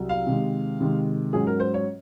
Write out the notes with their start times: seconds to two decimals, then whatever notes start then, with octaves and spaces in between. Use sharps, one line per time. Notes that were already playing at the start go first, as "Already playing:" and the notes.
Already playing: C2 F#3
0.09 F5
0.27 C3 D#3 G#3
0.80 C3 D#3 G#3
1.33 G#2 F#3 C#4 G#4
1.47 A#4
1.60 C5
1.74 C#5